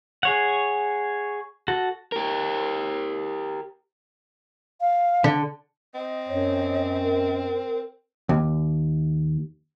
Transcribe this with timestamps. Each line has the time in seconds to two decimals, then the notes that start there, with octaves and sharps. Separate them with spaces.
0.23 G#4 C#5 F#5
1.68 F#4 A4
2.12 G4 A#4
4.81 F5
5.24 D3
5.95 C4 D#5
6.28 F#2 C#5
7.03 A#4
8.29 D#2